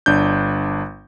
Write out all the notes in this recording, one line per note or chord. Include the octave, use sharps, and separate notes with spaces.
G1 D4 G6